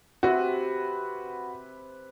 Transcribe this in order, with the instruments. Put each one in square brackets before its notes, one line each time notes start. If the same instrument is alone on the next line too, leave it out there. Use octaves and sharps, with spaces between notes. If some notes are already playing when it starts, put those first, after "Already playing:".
[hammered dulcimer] C3 B4 [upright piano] F#4